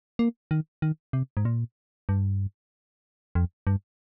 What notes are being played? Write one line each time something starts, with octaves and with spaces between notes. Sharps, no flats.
A#3
D#3
D#3
C3
G#2
A#2
G2
F2
G2